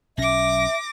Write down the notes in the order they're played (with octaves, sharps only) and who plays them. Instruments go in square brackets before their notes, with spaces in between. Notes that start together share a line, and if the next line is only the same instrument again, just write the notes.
[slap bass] B1 C#4 [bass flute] E5 [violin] D6 A#6